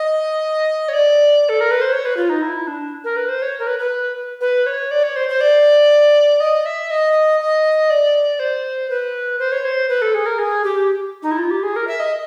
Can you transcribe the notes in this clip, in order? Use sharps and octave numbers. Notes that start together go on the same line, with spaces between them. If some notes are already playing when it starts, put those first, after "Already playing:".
Already playing: D#5
C#5
D5
A4
A#4
B4
C5
C#5
B4
F4
D#4
E4
D4
A#4
B4
C5
C#5
A#4
B4
B4
B4
C#5
D5
C#5
C5
C5
D5
D#5
E5
D#5
D#5
D5
C5
B4
C5
C#5
C5
B4
A4
G#4
A#4
G#4
G4
D#4
E4
F4
G4
G#4
A#4
E5
D#5